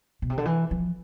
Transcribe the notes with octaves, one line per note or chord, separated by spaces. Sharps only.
B2
C3
D3
E3
F3